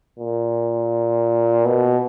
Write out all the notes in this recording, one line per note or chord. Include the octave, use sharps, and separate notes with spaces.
A#2
B2